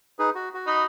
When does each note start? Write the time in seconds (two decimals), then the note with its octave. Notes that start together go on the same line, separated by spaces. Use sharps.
0.19 D#4 G#4 B4
0.35 F#4
0.54 F#4
0.67 D#4 B5 D#6